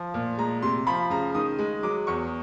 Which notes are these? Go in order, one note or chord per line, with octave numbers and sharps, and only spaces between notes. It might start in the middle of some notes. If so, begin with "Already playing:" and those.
Already playing: F3
A#2
G#3 A#5
C3 C6
F3 B5
C#3 A#5
D#3 D#6
G#3
F#3 D6
E2 C#6